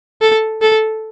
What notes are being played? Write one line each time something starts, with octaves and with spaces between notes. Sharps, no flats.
A4
A4